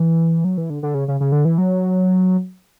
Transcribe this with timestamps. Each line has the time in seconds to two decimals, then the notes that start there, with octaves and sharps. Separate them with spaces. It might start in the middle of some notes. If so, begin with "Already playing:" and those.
Already playing: E3
0.44 F#3
0.57 E3
0.70 D3
0.83 D3
0.94 C#3
1.08 C#3
1.20 C#3
1.32 D3
1.45 E3
1.58 F#3